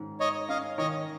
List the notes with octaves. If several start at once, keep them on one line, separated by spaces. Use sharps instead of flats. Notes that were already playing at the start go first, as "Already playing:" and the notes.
Already playing: G#2 D#3 C#4
G#2 C#5 D#5
C#4 D#5 F5
D#3 C#5 D#5